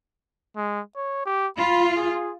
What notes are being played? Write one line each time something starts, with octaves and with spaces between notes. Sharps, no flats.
G#3
C#5
G4
F4 B5
G#4